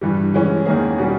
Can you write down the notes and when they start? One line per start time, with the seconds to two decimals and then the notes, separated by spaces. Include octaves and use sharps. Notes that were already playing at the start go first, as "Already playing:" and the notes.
0.01 G2 E3 G3
0.34 E3 G#3 C#4
0.66 E2 D#3 A#3 C#4 G#4
0.98 B2 G3 C#4